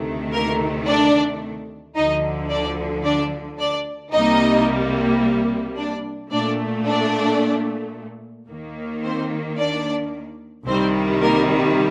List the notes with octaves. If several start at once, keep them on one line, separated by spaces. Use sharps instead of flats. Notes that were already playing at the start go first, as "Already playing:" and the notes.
Already playing: D2 C3 D#3 A3
A#3 A#4
D4 D5
D2 D3 F3 D#4 D#5
D4 D5
D4 D5
D4 D5
C2 C3 G3 A#3 D#4 D#5
D4 D5
A#2 A3 D4 D5
D4 D5
D#2 D#3 A#3
C4 C5
D4 D5
C2 C3 D#3 G3 C4 C5
A#3 A#4